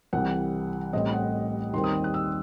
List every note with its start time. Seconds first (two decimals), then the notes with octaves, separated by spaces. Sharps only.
0.13 C2 C3 E3 G3 F#5
0.93 A1 A2 G3 C4 D#5
1.13 F#5
1.73 D#2 D#3 G3 C4 C6
1.84 D#6
2.04 F#6
2.14 E6